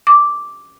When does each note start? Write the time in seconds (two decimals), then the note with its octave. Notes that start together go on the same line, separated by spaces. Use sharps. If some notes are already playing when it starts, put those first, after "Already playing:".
0.07 D6